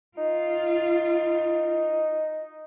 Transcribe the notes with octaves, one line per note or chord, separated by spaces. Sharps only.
D#4 F4